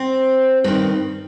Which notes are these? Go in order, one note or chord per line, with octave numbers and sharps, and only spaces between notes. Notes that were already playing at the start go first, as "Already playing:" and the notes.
Already playing: C4
G2 D#3 C4